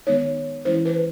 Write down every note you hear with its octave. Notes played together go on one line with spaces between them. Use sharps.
D#3 G#3 B3 D#4 C#5
E3 G#3 C#4 E4 C5
B4